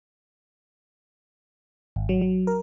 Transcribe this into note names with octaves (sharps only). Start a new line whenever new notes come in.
G#1
F#3
F#3
A#4